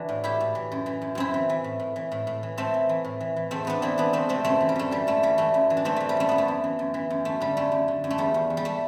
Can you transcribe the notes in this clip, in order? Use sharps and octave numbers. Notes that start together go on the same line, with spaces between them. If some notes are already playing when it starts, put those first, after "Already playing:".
Already playing: E3 D4 F#4
A2
A2 E4 G4
A2
E3
F#2
E3
F#2
F#2 C4 E4
E3
E3
A2
A2
E3
A2
A2
E3
A2 A3 C4
E3
E3
A2
E3
E3
E2 A3 C4
E2 B3 D4
E3 C4 E4
E3 B3 D4
E3 A3 C4
C3 A3 C4
F#2 A3 C4
E3
G3
F#2 A3
E3 G3
F#2 A3
E3 G3
E3 A3
F#2
E3
D4
E3 A3 C4
E3 A3
G3
F#2 A3
F#2 B3
A3
F#2
E3
F#2
E3
F#2
F#2 A3
D3 G3
F#2 A3
F#2
D3
F#2
A3
E2 G3
E2
E2
G3
A3